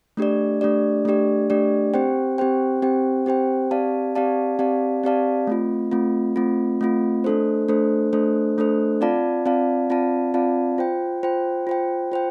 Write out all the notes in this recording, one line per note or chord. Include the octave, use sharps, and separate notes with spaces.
A3 D4 G4 D5
A3 D4 G4 D5
A3 D4 G4 D5
A3 D4 G4 D5
C4 G4 C5 G5
C4 G4 C5 G5
C4 G4 C5 G5
C4 G4 C5 G5
C4 G4 D5 F5 A5
C4 G4 D5 F5 A5
C4 G4 D5 F5 A5
C4 G4 D5 F5 A5
A3 C4 F4
A3 C4 F4
A3 C4 F4
A3 C4 F4
A3 D4 A4 C5
A3 D4 A4 C5
A3 D4 A4 C5
A3 D4 A4 C5
C4 F4 D5 F5 A5
C4 F4 D5 F5 A5
C4 F4 D5 F5 A5
C4 F4 D5 F5 A5
F4 C5 G5
F4 C5 G5
F4 C5 G5
F4 C5 G5